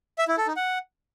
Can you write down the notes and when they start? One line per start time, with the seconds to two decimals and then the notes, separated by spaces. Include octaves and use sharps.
0.18 E5
0.28 E4
0.37 A4
0.47 D#4
0.56 F#5